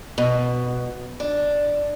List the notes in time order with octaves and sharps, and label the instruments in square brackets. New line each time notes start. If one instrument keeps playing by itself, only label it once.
[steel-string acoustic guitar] B2
D4